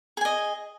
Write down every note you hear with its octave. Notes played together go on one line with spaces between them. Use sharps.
G#4 D#5 G#5